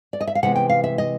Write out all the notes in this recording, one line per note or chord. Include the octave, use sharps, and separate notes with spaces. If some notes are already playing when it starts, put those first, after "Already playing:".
D5
D#5
E5
F5
C3 E3 G#3 B3 F#5
G5
F5
E5
D#5